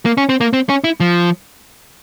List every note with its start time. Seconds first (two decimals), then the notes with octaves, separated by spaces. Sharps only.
0.05 A#3
0.17 C#4
0.29 C4
0.41 A#3
0.53 C4
0.69 C#4
0.84 E4
1.00 F3